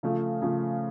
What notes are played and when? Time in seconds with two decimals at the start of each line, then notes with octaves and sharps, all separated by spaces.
0.03 C#3 F3 A3
0.42 C#3 F3 A3